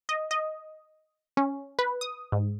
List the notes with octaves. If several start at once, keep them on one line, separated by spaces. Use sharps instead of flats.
D#5
D#5
C#4
B4
D#6
G#2